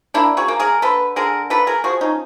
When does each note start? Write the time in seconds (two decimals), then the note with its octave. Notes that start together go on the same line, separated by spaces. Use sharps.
0.14 A#3 D4 E4
0.37 F#4 G#4
0.48 A#3
0.60 G#4 A#4
0.82 D3 A4 B4
1.16 D3 G#4 A#4
1.50 A#3 A4 B4
1.67 G#4 A#4
1.84 F3 F#4 G#4
2.01 C#4 D#4